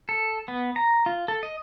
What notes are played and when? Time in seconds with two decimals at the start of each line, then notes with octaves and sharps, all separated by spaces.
0.09 A4
0.48 B3
0.76 A#5
1.06 F4
1.28 A4
1.43 D#5